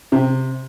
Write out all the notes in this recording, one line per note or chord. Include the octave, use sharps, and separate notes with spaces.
C3